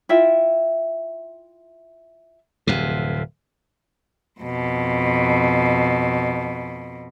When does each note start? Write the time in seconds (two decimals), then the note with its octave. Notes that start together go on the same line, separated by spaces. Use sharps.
0.09 E4 F4 E5 G5
2.67 D1 F2 C3
4.41 F2 B2